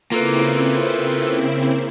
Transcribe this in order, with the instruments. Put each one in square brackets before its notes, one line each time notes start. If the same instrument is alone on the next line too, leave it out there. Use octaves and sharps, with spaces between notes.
[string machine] C#3 C4 E4 [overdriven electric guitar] A#3 [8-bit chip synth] F4 A4 B4